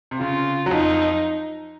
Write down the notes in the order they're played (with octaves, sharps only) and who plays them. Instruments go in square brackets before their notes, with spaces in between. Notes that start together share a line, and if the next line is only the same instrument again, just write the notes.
[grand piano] C3
[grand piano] C#3 [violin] F4
[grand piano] F#3
[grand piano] F2 F3 [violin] D#4